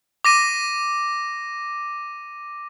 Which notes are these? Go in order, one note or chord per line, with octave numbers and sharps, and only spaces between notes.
D6 A#6 D#7